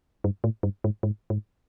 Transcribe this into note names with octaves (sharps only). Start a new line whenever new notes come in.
G2
A2
G2
G#2
G#2
G#2